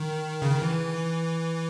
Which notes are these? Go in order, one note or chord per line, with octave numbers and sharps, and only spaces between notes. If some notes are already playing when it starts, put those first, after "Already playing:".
Already playing: D#3
C#3
D#3
E3